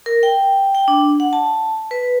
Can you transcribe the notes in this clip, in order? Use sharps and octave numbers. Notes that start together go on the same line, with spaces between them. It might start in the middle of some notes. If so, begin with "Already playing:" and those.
A#4
G5
G5
D4
F#5
A5
B4